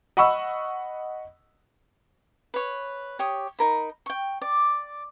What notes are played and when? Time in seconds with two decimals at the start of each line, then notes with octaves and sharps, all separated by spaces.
0.17 D#5 F#5 B5 C#6 E6
2.54 B4 C#5
3.19 G4 C#5 D#6
3.59 D#4 A#4 B5
4.06 G5 C#6
4.42 D5